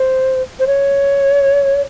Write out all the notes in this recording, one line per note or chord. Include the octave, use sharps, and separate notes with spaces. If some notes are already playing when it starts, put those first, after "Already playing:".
Already playing: C5
C5
C#5